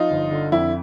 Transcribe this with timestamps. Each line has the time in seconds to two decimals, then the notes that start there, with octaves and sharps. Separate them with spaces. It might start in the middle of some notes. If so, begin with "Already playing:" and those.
Already playing: F3 D#4 F4
0.11 G1
0.31 D3
0.52 F2 E4